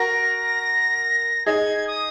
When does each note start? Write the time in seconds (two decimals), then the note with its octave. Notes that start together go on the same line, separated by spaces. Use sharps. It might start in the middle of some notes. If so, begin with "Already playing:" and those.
Already playing: F#4 A#4 A#6
1.46 D#4 G#4 G#6
1.87 D#6